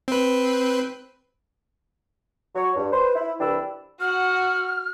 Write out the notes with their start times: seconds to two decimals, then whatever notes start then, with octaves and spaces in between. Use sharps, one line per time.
0.08 C4 B4
2.55 F#3 C#5
2.76 G2
2.92 B4 C5
3.15 E4
3.40 C2 E3 D4 G4 B5 E6
4.00 F#4 F#5 F6